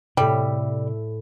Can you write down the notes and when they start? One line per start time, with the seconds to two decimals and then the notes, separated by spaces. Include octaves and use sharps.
0.17 A2 C3 G3 E5